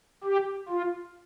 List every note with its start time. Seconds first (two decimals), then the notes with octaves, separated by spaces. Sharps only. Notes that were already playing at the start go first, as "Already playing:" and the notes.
0.24 G4
0.69 F4